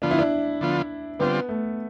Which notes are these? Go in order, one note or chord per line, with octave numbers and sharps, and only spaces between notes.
D3 F3 B3 D4 F4
E4
D4
D3 F3 B3 F4
D3 G3 B3 C4 F4
A3